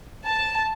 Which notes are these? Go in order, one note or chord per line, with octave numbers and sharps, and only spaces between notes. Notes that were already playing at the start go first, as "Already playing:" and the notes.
A5